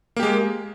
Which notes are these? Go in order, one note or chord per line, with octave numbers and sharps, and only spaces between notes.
G#3 A#3 G4